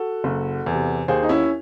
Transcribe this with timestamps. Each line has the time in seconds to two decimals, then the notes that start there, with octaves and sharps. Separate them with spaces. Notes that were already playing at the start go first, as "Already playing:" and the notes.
Already playing: F#4 A4
0.24 F#1
0.66 E2 C3
1.08 D#2 G#4 C5
1.23 D#4
1.29 C#4 E4